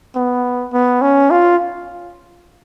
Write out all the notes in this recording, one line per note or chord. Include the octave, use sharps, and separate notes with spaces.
B3
B3
C#4
F4